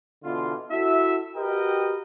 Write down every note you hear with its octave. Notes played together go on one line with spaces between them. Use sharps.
B2 D3 E3 F4
E4 F#4 A4 E5
F#4 G4 A#4 B4 D#5 G5